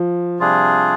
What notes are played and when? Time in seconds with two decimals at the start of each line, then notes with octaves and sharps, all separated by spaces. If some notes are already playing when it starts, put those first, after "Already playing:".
Already playing: F3
0.40 C3 G3 D4 F4 G#4